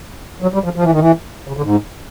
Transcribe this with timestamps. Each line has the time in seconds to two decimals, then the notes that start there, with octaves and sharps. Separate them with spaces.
0.42 F#3
0.54 G3
0.64 F3
0.76 F3
0.83 E3
0.92 D#3
0.99 E3
1.48 C#3
1.57 D3
1.64 G#2